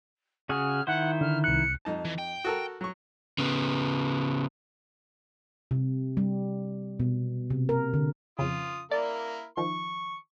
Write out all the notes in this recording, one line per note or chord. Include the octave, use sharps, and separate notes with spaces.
C#3 F#4 G#4 F6
D#3 E4 C5 F#5
D3 F6
C2 F#6 C#7
F2 D#4 A5
E3
G5
F#4 A4 A#4
F#3 C#6
C#3 B3
C3
G3
B2
C3
A#4
D3
F2 C#3 F4 D#6
A#3 E4 A#4 D5
D#3 F3 C#6